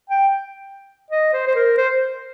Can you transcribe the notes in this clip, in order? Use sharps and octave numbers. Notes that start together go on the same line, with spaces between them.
G5
D#5
C5
C5
A#4
C5